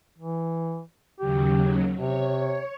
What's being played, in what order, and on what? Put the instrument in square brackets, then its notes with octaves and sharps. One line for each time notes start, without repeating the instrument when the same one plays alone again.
[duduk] E3
[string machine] D#2 C#3 F#3 [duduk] G4
[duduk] C3 [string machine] C#5